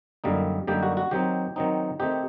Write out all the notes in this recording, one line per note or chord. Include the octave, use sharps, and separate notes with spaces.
F#2 D3 G3 A#3 D#4
F#2 D3 G3 A#3 D#4 G4
F#4
F#4
D#3 F#3 C4 D#4 G4
D#3 F#3 C4 D#4
D#3 A3 C4 D#4 G4